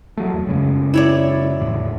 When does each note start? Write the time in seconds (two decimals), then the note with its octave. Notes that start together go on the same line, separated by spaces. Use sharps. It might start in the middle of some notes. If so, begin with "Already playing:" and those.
0.17 F#3 A3
0.34 E2
0.47 F#2 C#3 G#3
0.94 E4 C#5 D5
1.61 E2 A2 D3